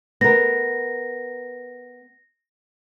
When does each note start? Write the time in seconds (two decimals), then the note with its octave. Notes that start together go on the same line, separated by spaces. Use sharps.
0.21 B3 A#4 A#6